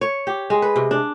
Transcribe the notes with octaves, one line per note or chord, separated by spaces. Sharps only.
C#5
G4
G#3
B4
C3
D4